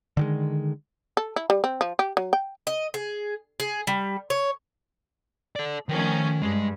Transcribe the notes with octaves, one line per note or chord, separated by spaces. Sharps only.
D3 D#3 G#3
A4
E4
G3
C4
F3
G4
F#3
G5
D#5
G#4
G#4
G3
C#5
A4 D5
D#3 F3 A3 C#4 A#4
G2 G#3